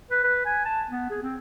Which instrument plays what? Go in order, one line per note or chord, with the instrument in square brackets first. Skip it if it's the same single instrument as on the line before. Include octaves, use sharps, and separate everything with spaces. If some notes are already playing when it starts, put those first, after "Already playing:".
[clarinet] B4
B4
G#5
A5
B3
G#4
C4